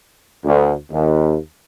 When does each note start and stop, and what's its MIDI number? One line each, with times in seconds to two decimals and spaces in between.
0.45 0.73 38
0.91 1.36 39